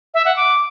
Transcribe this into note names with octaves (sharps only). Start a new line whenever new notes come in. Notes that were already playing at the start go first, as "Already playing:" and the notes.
E5
F#5
D6